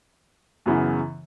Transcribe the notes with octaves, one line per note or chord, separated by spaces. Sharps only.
F#2 C#3 E3 B3 E4